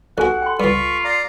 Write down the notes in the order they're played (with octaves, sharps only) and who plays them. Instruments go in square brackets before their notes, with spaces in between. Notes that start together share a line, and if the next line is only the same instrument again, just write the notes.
[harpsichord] B1 F#4 [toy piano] G4 A4 G#5 [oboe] F#5
[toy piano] G5 C6
[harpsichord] C#2 G2 [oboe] F4 [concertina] B5 C#6
[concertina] D5 F5 A#5